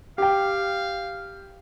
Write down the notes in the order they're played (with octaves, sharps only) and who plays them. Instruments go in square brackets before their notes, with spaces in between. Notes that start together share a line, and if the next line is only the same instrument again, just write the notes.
[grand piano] G4 G5 [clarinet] F5